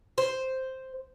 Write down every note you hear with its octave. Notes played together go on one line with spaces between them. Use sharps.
C5